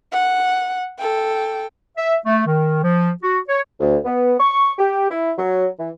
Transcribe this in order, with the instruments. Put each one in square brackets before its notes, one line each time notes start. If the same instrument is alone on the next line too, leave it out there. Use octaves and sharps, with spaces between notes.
[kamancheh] F#5
A4 G5
[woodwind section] E5
A3
D#3
F3
F#4
C#5
D2
B3
C#6
G4
E4
F#3
E3